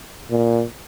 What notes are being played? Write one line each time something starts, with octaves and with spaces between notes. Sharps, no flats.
A#2